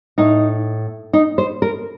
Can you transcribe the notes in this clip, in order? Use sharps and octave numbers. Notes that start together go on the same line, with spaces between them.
A2 D#4
D#4
C5
A#4